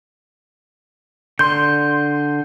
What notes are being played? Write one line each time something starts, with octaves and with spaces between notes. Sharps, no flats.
D3 C6 G6